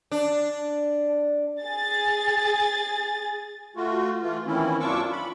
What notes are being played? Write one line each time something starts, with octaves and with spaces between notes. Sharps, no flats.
D4
G#4 A6
A3 F4 F#4
E3 A3 F4
D#3 E3 A#3 C4 C#4 E4
F#2 D4 F4 C#6 D6 E6
B5